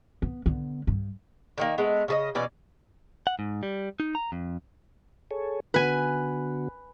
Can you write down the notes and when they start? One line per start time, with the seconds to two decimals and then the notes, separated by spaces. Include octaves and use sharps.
0.22 B3
0.46 D3 B3
0.87 G2
1.58 D3 D#3 A#3
1.78 G#3 A3 B3
2.08 C#3 A4 D#5
2.35 B2 E3 C#4 D5
3.27 F#5
3.39 G#2
3.63 G3
4.00 D#4
4.15 A#5
4.32 F2
5.31 G#4 A4 C#5
5.74 D3 B3 F#4 B4 G#5